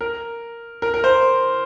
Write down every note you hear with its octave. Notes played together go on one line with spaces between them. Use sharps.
A#4
A#4
A#4
C5